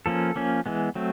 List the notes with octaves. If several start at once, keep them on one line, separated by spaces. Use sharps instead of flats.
F3 A#3 C#4 A4
F3 A#3 C#4
E3 G#3 B3
F#3 A3 C4